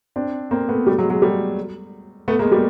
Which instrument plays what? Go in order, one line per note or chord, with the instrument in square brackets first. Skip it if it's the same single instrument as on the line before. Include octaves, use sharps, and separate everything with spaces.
[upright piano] C4 D4
A#3 C4
A3 B3
G3 A3
F#3 G#3
F#3 G#3
G3 A3
A3 B3
G#3 A#3
G3 A3